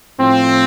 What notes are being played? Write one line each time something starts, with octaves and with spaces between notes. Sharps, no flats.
A2 F3 C4